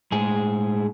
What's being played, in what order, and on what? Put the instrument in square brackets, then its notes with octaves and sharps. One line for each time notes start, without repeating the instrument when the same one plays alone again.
[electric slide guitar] A2 G#3 G#4